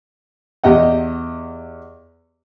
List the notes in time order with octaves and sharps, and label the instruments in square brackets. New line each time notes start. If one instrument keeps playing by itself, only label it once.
[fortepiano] E2 G4 D#5 F#5